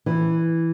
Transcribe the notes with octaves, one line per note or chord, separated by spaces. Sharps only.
E3